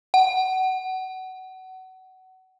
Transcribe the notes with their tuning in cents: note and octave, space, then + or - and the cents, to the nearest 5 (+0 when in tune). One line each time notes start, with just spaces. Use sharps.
F#5 +25